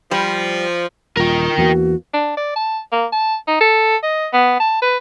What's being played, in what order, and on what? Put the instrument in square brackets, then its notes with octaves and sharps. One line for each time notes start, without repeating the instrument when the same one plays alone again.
[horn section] F3 [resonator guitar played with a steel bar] G3
[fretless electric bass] D#1 [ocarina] F4 [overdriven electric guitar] A#4 G5
[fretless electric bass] E2 E3 A#3 [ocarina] F#4
[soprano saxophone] D4
D5
A5
A#3
A5
D#4
A4
D#5
B3
A5
B4